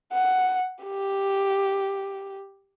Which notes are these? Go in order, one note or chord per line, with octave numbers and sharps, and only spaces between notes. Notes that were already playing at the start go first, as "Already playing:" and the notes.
F#5
G4